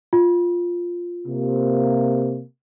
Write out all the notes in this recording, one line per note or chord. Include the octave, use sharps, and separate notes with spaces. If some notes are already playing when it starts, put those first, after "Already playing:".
F4
C3 A#3